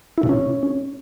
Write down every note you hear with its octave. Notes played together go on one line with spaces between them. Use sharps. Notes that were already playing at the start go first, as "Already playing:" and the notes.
E4
B2
C#4